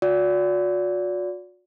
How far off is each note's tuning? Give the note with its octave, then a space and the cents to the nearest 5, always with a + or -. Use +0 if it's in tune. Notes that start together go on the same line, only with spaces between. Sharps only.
F#4 -40 D5 -30